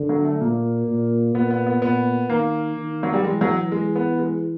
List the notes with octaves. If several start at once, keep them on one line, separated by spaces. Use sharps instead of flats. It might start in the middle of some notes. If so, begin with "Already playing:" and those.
Already playing: D3
F#3
A3
A#2 A#3
A#2
A#2 B3
B3
B3
A#2 B3
D#3 A#3
D#3
F#3
G3
E3 G#3
F#3
G#3
B3
G#3